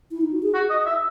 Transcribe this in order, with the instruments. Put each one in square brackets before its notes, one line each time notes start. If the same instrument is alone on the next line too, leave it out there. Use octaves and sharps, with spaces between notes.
[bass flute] E4
D#4
F#4
G#4
[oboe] F#4
D#5
E5